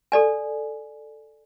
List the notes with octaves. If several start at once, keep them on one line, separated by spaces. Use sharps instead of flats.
A4 D5 G#5